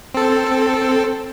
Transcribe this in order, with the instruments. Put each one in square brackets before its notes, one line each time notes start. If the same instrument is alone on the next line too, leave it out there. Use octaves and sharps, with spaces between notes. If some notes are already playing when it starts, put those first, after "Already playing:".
[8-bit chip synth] C4 A4